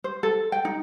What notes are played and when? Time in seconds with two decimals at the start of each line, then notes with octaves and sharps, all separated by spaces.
0.04 C5
0.23 A4
0.52 G5
0.65 D#4